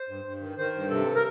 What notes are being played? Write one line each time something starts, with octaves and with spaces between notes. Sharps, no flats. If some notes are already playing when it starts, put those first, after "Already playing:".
Already playing: C5
G2
G2
D#3
D#3 C5
G2
C3 A4
A#4